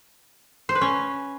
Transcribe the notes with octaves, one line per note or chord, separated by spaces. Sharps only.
C5
B4
C#4